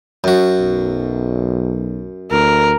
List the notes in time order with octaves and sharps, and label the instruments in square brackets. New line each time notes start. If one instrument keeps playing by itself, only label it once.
[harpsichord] F#2 F#4
[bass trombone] B1
[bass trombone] D2 [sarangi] A#4